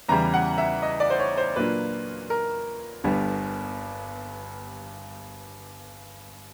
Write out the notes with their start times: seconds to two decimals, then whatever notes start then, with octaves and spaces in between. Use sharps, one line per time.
0.09 E2 C#3 E3 G3 A#5
0.34 F#5
0.58 E5
0.82 D#5
1.00 D5
1.10 C5
1.19 C#5
1.37 C5
1.56 A#2 F#3 A#3 D4 F4 B4
2.30 A#4
3.04 G1 G2 D3 G3 B3